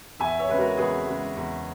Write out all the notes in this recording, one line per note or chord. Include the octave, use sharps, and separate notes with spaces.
E2 E5 G#5
C#5 E5
C#3 G#3 B4
F#4 A#4
E2 G#4 B4
C#3 G#3
E2